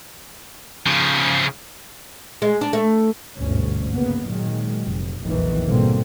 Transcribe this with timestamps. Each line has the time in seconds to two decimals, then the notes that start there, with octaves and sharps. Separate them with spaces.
0.87 C#3 F3
2.42 G#3
2.61 D4
2.73 A3
3.37 G1 D2 G#2 B2 C#4
3.93 C#3 A#3 B3
4.26 A#2 D#3 F#3 G#3
4.84 F1
5.23 F1 B1 E2 A#2 D#3 E3
5.67 G#2 B2 D3 G3 A#3 C4